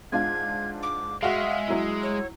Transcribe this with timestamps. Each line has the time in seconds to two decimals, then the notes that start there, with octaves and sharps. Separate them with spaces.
0.12 G#2 D4 F4 G#6
0.83 D6
1.23 G#3 F#4 E5 F5
1.68 F#3 E4
2.03 C#5